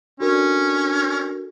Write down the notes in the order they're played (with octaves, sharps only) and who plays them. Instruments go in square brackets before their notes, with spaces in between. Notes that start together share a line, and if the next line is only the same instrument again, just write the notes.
[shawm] C#4 [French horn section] D4 [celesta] F#4 A4 A#4